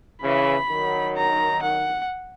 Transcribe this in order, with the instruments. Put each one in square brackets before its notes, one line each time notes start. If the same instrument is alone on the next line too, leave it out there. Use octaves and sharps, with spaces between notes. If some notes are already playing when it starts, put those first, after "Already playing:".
[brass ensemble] C#3 E3 [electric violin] B5
[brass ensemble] D#3 F#3
[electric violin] A#5
F#5